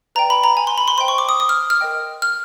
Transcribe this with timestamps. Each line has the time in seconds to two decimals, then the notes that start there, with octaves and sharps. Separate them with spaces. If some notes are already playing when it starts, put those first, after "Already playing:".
0.15 B4 D5 G5 A#5
0.30 B5
0.44 A#5
0.57 G#5
0.67 C6
0.78 B5
0.88 C6
0.98 C5 D#5 G5 C6
1.08 C#6
1.18 D6
1.29 D#6
1.40 D#6
1.49 F6
1.70 F6
1.81 A#4 D#5 G5
2.22 F6